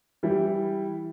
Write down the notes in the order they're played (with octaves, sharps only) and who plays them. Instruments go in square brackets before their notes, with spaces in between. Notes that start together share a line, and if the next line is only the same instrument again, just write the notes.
[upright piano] E3 G3 E4